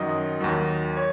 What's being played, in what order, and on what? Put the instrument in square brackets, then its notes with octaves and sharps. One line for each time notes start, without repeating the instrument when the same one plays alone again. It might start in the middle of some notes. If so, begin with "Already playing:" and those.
Already playing: [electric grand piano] F#2 D#3 F#3 D#5
D#2 D#3 F#3
C#5